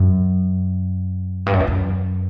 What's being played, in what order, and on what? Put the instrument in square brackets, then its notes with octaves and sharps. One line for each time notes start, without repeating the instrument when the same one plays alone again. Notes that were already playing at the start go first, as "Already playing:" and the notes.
Already playing: [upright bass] F#2
G2
F#2
E2
F#2